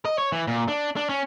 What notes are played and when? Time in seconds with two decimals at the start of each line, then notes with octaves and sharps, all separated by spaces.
0.05 D#5
0.18 C#5
0.32 E3
0.47 A#2
0.68 D4
0.96 D4
1.09 C#4